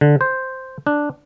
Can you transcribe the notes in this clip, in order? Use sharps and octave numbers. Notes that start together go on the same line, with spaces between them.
D3
C5
D4